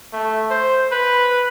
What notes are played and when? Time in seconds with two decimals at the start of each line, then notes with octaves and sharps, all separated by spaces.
0.13 A3
0.51 C5
0.92 B4